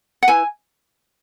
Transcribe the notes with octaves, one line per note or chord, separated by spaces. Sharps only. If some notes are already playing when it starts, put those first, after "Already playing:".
F#5
E4 B4 G#5